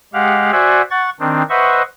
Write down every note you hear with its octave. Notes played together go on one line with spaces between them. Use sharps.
G#3 G4 F5 F#5
F#4 C5 D5 E5 F#5 G#5
F#5 C#6 A6
D#3 C4 D4
B4 C5 D#5 E5 F#5 C#6